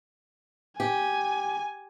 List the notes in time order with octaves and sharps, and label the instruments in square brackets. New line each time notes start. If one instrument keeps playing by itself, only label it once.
[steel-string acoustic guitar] G4 [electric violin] G#5